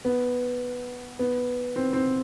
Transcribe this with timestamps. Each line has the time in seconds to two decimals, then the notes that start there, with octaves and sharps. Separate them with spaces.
0.05 B3
1.19 B3
1.76 C4
1.93 C4